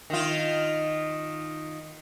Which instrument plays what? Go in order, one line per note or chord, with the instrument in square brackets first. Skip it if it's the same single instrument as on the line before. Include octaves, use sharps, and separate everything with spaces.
[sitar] D#3 F4